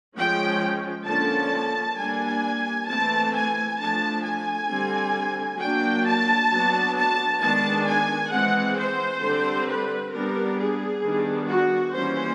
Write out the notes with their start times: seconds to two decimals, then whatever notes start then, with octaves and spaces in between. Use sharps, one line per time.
0.17 F3 G#3 C#4 G5
1.07 D3 F3 A#3 C#4 A5
1.97 G3 A#3 D4 G#5
2.88 E3 A3 C4 A5
3.34 G#5
3.79 F3 A3 D4 A5
4.24 G#5
4.69 D3 G3 C4
5.60 F#3 A#3 D4 G5
6.06 A5
6.51 F#3 B3 D4
6.96 A5
7.41 D#3 G#3 B3 D4 A5
7.87 G#5
8.32 E3 G#3 C4 F#5
8.77 C5
9.22 D3 G3 C4
9.67 B4
10.13 G3 B3 D4 A#4
10.58 G#4
11.03 D#3 G3 B3 D4
11.48 F#4
11.94 E3 G3 A#3 C#4 C5